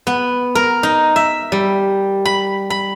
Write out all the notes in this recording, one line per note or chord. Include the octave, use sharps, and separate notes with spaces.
B3
A#4
D#4
E5
G3
B5
B5